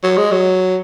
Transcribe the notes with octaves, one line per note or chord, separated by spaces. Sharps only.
F#3
G#3
F#3